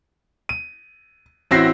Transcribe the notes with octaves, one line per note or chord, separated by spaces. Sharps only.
D#7
A1 C4 E4 F#4 A#6 C7